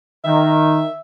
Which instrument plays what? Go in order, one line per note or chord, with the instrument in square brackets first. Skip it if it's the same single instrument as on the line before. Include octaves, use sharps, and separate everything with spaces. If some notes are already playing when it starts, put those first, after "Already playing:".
[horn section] D#3 [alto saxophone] E5